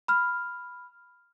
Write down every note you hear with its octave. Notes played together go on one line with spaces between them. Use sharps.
B5 F6